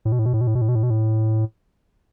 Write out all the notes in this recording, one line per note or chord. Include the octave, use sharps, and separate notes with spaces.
A2
B2
A2
B2
A2
B2
A2
B2
A2
B2
A2
B2
A2